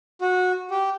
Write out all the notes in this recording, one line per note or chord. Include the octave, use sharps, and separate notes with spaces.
F#4
G4